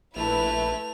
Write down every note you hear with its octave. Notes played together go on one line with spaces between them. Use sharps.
A#1 A3 E4 B4 F7